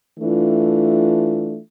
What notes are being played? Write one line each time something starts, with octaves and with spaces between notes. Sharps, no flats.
E3 A3 D4 F4